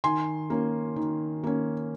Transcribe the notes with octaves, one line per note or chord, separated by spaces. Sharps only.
D#3 G#5 C6
A#3 C#4
D#3
A#3 C#4